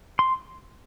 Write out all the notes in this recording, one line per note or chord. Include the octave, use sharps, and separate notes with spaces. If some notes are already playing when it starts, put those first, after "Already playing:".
C6